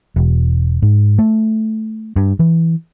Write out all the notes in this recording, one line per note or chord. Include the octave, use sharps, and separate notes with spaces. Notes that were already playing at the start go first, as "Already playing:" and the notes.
E1
G#2
A3
G2
E3